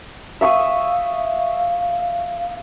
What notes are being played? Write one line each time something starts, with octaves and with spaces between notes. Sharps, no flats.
E5 F5 C#6 D#6